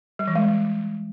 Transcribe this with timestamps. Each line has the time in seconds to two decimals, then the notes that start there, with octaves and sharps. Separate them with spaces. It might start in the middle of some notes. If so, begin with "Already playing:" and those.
0.19 G3
0.27 E3
0.35 G#3